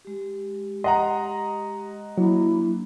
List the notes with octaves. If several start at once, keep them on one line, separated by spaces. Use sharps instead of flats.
G#3 G4
D#5 F#5 A#5 C6
F#3 A#3 D4 E4